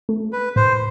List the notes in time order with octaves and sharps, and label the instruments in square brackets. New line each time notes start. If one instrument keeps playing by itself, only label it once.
[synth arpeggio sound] A3
[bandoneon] B4
[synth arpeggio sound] A2 [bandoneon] C5